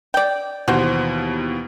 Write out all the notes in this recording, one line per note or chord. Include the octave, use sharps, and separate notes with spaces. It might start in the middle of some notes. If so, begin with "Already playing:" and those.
D5 G5
D#2 B2 E3 F#4 C5